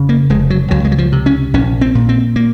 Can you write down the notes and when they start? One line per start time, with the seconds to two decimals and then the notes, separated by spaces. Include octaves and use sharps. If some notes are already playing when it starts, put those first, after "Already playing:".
Already playing: F1 C#3
0.09 A#3
0.30 F1 G#3
0.50 F#3
0.71 C#2 F#3
0.85 G#3
0.92 F#3
0.98 F3
1.12 C3
1.26 C#4
1.54 A#1 C#4
1.81 C4
1.95 A#2
2.09 C4
2.36 A#3